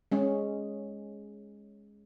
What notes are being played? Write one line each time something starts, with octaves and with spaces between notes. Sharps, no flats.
G#3 C#4